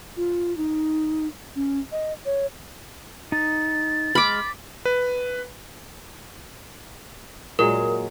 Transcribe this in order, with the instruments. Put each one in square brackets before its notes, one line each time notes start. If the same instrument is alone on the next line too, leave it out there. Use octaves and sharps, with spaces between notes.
[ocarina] F4
D#4
C#4
D#5
C#5
[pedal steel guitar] D#4 [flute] A6
[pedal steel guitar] G#3 F6 [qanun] B5 D6
[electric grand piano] B4
[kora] A#2 F#3 G#3 [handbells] A#4